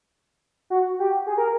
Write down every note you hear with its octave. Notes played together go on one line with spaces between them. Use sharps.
F#4
G4
G#4
A#4